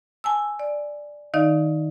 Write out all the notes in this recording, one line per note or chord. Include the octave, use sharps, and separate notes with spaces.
G#5 A5 E6
D5
D#3 D#4 D5 D#5 F5